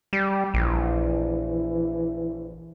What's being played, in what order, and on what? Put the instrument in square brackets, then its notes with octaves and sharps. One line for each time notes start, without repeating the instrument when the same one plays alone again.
[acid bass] G3
[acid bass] A#1 [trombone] E3